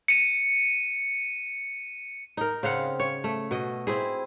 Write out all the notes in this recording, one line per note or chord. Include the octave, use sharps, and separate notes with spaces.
C#7 D#7
D#4 A#4
C#3 C4 F5 F#5
C#5
A3
B2 D#5
C4 E4 G#4